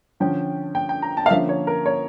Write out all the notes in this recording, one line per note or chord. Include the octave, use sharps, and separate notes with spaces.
D3 F3 C#4 G5
G5
G5
A#5
A5
F5
D3 F3 A#3 C#4 E5
C#5
A#4
C#5